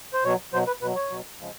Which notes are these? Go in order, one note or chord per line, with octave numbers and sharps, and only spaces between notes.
C5
B2 F#3 C#5
B2 F#3 C5
B4
B2 F#3 B4
C#5
B2 F#3
C#3 F3 G#3